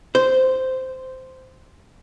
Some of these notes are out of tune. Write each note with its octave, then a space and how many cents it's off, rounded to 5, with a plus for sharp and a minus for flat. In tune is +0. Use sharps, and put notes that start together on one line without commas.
C5 -10